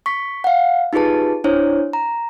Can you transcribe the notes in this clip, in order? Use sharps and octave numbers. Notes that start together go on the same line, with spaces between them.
C#6 B6
F5 F#5
D#4 F4 G4 G#4 B4 A5
D4 E4 C5 C#5
A#5